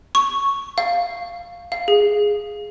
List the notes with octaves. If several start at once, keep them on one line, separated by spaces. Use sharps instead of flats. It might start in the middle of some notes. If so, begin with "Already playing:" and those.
C#6
F5
F5
G#4